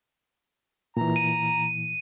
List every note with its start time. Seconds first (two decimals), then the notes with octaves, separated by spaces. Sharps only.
0.97 A#2 E3 A#5
1.16 D#7